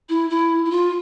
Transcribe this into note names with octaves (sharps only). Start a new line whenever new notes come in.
E4
E4
E4
F4